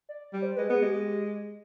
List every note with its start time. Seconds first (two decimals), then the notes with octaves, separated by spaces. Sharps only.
0.09 D5
0.33 G3
0.42 C5
0.56 G#3 B4
0.70 B3 G#4
0.82 G#3 G4